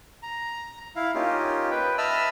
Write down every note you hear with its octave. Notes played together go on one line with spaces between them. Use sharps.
A#5
E4 F5
A#3 C#4 D#4 F4 G4
B4 G5
D#5 E5 A5 B5 E6 F6